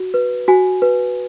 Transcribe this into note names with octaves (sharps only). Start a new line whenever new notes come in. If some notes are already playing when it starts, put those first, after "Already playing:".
Already playing: F#4
B4
F#4 G#5
B4